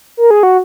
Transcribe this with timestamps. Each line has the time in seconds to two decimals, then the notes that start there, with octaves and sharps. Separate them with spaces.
0.17 A#4
0.31 G#4
0.43 F#4